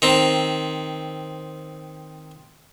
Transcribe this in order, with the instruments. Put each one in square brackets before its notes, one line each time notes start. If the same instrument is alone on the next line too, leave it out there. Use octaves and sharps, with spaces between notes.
[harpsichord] D#3 C4